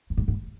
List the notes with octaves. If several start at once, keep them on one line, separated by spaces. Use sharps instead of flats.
F#2
G#2
G#2